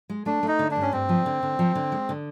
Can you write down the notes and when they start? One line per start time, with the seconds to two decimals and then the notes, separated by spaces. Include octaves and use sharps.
0.10 G#3
0.26 A3 D4
0.43 A3 D#4
0.59 D3
0.71 G2 D4
0.82 C#4
0.92 G2 C4
1.09 F3
1.26 D3
1.43 D3
1.59 F3
1.75 D3
1.92 G#3
2.09 D3